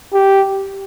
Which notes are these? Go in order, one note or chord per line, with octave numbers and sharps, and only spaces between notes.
G4